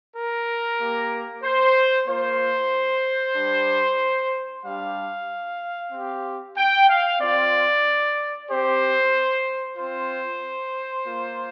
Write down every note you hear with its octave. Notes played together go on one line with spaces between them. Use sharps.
A#4
A#3 G4
C5
A#3 F4 C5
G3 D4 G4
G3 D4 G4 F5
C4 G4
G5
F5
C4 F4 D5
C4 G4 C5
C4 F4 C5
A#3 F4